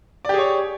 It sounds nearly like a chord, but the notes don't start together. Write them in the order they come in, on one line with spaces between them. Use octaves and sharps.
D5 G4 G#4 C#5